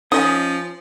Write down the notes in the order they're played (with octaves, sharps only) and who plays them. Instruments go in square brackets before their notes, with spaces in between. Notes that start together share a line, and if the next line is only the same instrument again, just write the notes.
[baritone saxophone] F3 [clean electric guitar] C#4 [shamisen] D#4 D#5 G#5 [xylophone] D#6